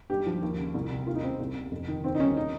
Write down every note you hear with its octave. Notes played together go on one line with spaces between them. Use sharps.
G2 G4
F3
D#2
C#3
C2
C3
D#2 F4
D#4
C#3 C4
C2
C3
F2
D#3
D#2 C4
D#4
D#3 C#4
D#4